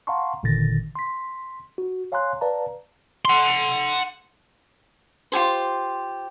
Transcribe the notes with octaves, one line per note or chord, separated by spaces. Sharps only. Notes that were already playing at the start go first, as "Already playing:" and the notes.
F5 F#5 A5 A#5 C6 C#6
G1 A#2 D3 D#3 A6 A#6
C6 B6
F#4
C#5 F5 G#5 A#5 C6 F#6
B4 D5 F5 A5 A#5
F#5 C6
F4 G4 G#4 C5